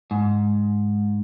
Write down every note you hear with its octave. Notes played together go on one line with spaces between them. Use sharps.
G#2